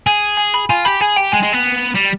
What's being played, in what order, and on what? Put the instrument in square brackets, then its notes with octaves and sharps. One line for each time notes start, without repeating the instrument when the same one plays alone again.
[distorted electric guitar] G#4 [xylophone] G#5
[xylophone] G#5
B5
[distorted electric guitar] F4 [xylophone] G#5
[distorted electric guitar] G4 [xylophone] B5
[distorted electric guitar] G#4 [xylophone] G#5
[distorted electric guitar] G4 [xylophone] G5
[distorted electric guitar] G#3 [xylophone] G#5
[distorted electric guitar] G#3
B3
G3